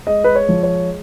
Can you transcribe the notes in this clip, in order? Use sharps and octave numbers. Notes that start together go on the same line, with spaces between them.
G#3 D#5
B4
C#5
F3
C#5